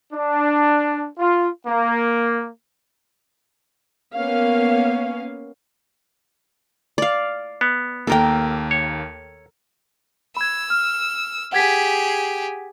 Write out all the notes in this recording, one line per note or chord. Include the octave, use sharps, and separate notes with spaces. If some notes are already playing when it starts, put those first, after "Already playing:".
D4
F4
A#3
A#3 B3 C#4 F5
D5 F5
B3
D#2 A#3 A4 A#4 G5
C#5
B5 E6 G#6
F6
G4 G#4 F#5 G#6 B6